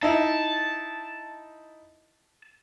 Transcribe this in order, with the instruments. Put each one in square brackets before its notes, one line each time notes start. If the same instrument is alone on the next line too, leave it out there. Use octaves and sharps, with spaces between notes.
[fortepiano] D#4 E4 [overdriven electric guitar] A5